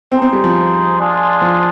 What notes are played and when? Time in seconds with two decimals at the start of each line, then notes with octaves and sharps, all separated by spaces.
0.12 C4 D#4 G#4 C5
0.22 C4
0.33 G3
0.44 F3
0.98 G#3 D4 F4 G#4
1.41 F3